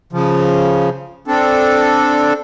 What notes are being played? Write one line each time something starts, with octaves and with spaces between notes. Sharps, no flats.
C#3 F3
C4 D4 A4